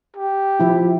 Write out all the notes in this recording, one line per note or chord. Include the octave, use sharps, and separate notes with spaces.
G4
F3 E4